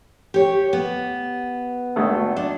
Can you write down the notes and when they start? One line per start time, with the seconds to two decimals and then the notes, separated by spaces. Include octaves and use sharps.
0.34 G4 C#5
0.73 B3
1.96 G#1 A3
2.37 D4